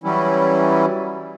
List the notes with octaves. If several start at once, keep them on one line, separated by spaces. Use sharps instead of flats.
E3 F#3 G3 C#4 E4